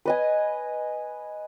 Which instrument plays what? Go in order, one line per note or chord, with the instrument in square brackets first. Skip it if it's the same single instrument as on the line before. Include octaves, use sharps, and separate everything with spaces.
[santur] B4 D#5 G#5